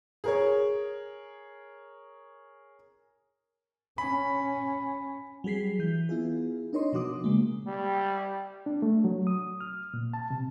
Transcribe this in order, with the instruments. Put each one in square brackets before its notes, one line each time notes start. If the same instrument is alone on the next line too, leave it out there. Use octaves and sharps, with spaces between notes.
[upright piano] G#4 A#4 C#5
[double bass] C#4 [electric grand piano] B5
[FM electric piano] F#3 G3 G#4 B6 C7
E3 G6
B3 E4 F4 G#4
D4 D#4 A#4 C#5 D#5 C6
B2 F3 D4 F#4 D6 D#6
C#3 G#3 A#3
[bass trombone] G3
[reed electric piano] D4
A3
F#3
D#6
F6
A#2
A5
C3